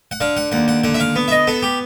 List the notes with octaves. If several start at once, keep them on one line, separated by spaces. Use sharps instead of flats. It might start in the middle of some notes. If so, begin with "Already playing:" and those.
F#5
D3 F5
F#5
D#2 F#5
F#5
D3 F#5
E5
F5
B3
E5
D#5
B3 A4
G4